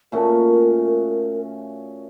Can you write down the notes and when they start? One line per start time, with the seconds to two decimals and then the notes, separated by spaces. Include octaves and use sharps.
0.12 A#2 A3 C#4 F#4 A#4